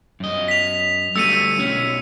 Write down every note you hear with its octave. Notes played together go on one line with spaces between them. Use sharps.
F#2 D#5
B6 F7
D3 G3 A3 E6 C#7 D#7
B1 C#4